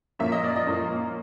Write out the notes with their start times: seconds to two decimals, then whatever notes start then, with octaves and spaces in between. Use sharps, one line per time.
0.19 A#2 F3 A#3 C#4 E5
0.32 D#5
0.44 D5
0.56 D#5
0.67 A#2 F3 A#3 C#4